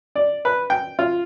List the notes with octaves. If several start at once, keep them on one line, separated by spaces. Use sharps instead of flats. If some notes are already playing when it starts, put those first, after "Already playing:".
D5
B4
G5
F4